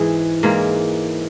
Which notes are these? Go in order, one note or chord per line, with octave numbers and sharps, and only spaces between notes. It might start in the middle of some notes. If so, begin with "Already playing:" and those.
Already playing: G#2 E3 G#4
G#2 E3 A#3